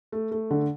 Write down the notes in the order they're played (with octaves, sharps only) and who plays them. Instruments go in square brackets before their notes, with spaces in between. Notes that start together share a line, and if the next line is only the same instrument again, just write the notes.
[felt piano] A3
A3
D3